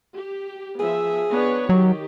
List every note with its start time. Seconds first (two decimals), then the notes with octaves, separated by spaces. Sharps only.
0.17 G4
0.80 F3 B3 G#4 E5
1.31 B3 D4 C#5
1.69 D#3 F#3 G4